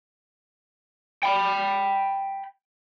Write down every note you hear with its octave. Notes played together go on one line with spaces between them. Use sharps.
G5 B5